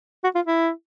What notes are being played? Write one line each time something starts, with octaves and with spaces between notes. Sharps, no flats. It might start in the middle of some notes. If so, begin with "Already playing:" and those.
F#4
F4
E4